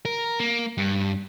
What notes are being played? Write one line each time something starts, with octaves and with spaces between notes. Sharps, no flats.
A#4
A#3
G2